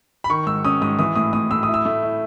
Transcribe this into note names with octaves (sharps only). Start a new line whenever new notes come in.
B5
D#3 C#6
G#2 E6
C#4 D#6
G#2 D#6
E3 D#6
A2 D#6
A2 D#6
A2 E6
D#6
E4
E6
A3
E4